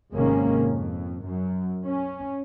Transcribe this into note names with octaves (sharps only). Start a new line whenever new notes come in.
G#1 C3 D#3 G#3 A#3 C#4
F2
F#2
C#4